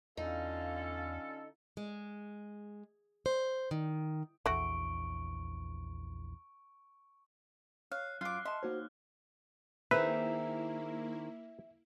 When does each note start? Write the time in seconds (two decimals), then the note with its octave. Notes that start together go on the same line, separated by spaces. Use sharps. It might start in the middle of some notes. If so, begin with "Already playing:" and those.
0.17 E2 D3 C#4 D#4 F4 A4 F5
1.77 G#3
3.26 C5
3.71 D#3
4.46 A#1 E2 A3 F#4 C#6 D7
7.92 C#5 F5 F#6
8.21 F#2 F4 D6 F6 F#6 C7
8.45 D#5 E5 A5 C6
8.63 A#3 D#4 F#4 C5 C#5
9.91 D#3 A#3 C4 E4 G#4 B4 E5